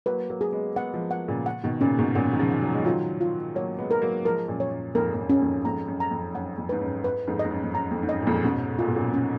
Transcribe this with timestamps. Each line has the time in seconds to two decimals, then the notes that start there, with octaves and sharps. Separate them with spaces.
0.06 F#3 A#3 B4
0.30 F#3 A#3
0.41 G#4
0.52 G#3 B3
0.76 G#3 B3 F#5
0.94 F3 G#3
1.11 F#5
1.28 A#2 C#3
1.46 F#5
1.64 B2 D#3
1.81 A#2 C#3 C#4
1.98 G#2 B2
2.15 F#2 A#2 F#5
2.33 D#3
2.39 C#3 F3
2.51 F#5
2.62 F#3
2.73 G#3
2.84 D#3 F#3 F4
3.21 F4
3.55 F#3 A#3 C#5
3.78 G#3 B3
3.91 A#4
4.02 F#3 A#3
4.25 F3 G#3 A#4
4.48 F#2 A#2
4.60 C#5
4.72 F#2
4.95 F2 G#2 A#4
5.14 F2
5.18 F#2
5.29 C#4
5.41 F2 G#2
5.65 F2 G#2 A#5
5.88 F#2
6.00 A#5
6.11 F2
6.35 F#2 F#5
6.58 F2
6.69 G#2 B4
6.81 F#2
7.04 B4
7.28 F2 G#2
7.39 D#5
7.45 G#2
7.51 F#2
7.63 F2
7.74 F#2 A#5
7.91 F2
8.03 G#2
8.09 F#2 D#5
8.22 A#2
8.27 F2 G#2
8.44 G#2 B2 C#4
8.79 A#2 F4
8.88 B2
8.96 F#2 A#2
9.14 C#4